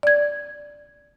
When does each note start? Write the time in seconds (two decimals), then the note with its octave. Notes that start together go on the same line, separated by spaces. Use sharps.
0.03 D5 G#6